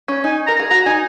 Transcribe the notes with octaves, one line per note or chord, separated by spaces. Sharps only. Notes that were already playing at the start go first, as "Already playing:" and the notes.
C#4
D#4 G#5
A#4 A#5
G#4
F#4 A#5
D#4 G#5